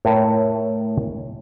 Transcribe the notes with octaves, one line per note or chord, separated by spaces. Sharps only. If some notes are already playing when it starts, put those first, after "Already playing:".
A2 A#4 C#5